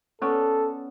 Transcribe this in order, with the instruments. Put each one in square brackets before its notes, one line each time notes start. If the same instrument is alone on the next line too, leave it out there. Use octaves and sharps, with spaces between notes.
[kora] B3 C#4 D5 [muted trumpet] A4